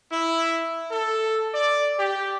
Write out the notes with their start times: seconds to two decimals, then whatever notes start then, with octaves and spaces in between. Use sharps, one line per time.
0.11 E4
0.91 A4
1.54 D5
2.00 G4